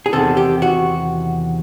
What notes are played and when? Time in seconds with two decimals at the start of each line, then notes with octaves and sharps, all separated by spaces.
0.06 G#4
0.12 E2 C3 D#3 A4
0.37 G4
0.62 F#4